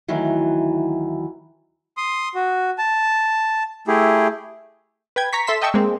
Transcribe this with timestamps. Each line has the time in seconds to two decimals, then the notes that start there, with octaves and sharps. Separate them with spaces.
0.08 D2 D#3 E3 F#3
1.97 C6 D#6
2.35 F#4
2.78 A5
3.88 A3 E4 G4 G#4
5.16 B4 G5 G#6
5.33 A#5 C#6 B6
5.47 A4 E5 C6 B6 E7
5.61 D#5 E5 G5 A5 C#6 E6
5.74 G#3 A#3 C4